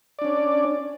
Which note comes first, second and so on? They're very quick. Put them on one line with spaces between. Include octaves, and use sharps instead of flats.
D5 D4 C#4